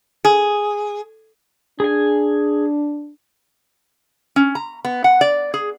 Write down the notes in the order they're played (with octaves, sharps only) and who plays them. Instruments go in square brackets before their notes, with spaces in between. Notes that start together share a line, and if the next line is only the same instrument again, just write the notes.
[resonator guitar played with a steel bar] G#4
[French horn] D4 [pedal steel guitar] G#4 G#5
[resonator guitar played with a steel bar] C#4
A#5
B3
F#5
D5
G#4